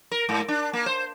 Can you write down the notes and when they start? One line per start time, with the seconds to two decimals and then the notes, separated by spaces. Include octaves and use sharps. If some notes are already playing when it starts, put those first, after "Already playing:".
0.11 A#4
0.29 G#2
0.48 D4
0.73 A#3
0.86 C5